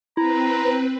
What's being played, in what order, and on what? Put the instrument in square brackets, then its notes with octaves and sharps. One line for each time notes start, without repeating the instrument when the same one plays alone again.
[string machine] C4 B4 [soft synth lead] E4 [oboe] A#5